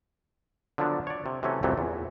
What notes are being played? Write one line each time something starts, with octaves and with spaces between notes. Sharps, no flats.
D3 F3 F#3 B3 D4
C#5 D5
C3
C3 E3 F#3 A3 C#4
C2 F2 C3 E3 F#3 A3
E2 A#2